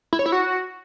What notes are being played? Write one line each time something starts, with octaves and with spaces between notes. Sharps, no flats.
E4
C#5
E4
F#4